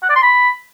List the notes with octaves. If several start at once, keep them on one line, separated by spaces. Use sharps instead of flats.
F#5
D5
C6
B5